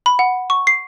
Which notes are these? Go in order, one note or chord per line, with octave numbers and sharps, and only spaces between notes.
B5
F#5
C#6
C7